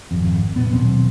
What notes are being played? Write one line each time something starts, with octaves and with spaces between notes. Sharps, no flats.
G#1 F2
F1 C2 A#2 B3
D#2 B2 F#3 C4